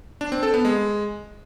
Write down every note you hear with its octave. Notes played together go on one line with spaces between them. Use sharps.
D4
C4
A4
B3
G#3